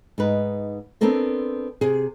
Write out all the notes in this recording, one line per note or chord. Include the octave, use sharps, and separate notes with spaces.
G#2 D#4 B4
B3 C4 D4 A4 A#4 C5
C3 G#4